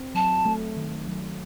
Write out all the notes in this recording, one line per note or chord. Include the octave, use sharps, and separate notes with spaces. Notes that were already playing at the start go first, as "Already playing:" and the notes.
Already playing: C4
F#3 A5
A3
D#3
F#3